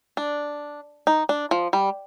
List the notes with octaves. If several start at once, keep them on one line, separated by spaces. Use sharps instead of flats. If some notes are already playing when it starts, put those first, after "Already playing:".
D4
D#4
D4
F3
G3